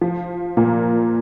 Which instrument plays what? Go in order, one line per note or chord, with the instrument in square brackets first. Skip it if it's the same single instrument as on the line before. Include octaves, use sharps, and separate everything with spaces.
[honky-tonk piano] F3
A#2 A#3